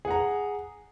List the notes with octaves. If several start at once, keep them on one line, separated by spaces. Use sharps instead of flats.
G#4 F#5 A#5